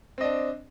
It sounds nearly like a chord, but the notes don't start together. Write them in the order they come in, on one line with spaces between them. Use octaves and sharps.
C4 D#5 D4